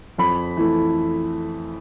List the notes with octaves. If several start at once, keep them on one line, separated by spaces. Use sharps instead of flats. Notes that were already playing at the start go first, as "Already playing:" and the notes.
F2 B5
E3 A3